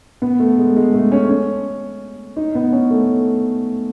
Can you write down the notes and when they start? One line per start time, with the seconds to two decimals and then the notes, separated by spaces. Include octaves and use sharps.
0.22 B3
0.40 A3
0.58 G#3
0.76 G#3
0.94 A3
1.12 C#4
1.29 C#4
2.36 D#4
2.55 B3
2.72 C#4
2.91 A3